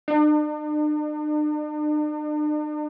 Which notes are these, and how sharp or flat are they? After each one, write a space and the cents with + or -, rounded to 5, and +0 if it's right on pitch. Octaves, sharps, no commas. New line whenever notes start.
D4 +45